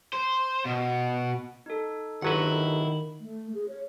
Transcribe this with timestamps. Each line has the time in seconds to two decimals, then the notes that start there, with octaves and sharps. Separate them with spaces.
0.13 C5
0.65 B2
1.66 D#4 A4
2.22 G1 D#3 F#3 E4 B4 F#5
3.20 A3
3.53 G#4
3.68 C#5